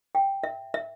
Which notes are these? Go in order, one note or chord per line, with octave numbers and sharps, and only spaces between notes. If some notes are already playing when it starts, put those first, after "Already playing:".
G5
E5
E5